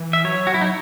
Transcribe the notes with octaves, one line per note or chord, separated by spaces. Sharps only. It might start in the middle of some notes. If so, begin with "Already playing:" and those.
Already playing: E3
E5
F#3 C#5
F#4
E4
D#4